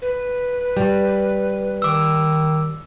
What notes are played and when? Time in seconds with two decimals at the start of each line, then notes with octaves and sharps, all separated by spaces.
0.02 B4
0.77 G3
1.82 D#3 D6 E6